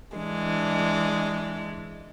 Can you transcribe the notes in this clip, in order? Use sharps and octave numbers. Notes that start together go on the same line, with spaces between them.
E3 G#3 D4